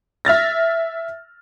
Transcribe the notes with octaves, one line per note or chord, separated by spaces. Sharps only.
E5 F6 A6 A#6